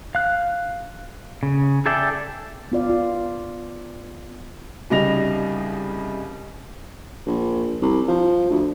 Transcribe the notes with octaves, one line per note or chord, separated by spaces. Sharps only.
F5 F#6
C#3
G#4 A4 D5 E5 G5
B3 F4 D5 F5
F4
C2 C#3 G3 D#4 A#6 F7
A#1
C2
F3
D2